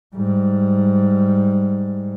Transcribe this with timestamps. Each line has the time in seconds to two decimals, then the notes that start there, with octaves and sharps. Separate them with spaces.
0.15 G#2 G3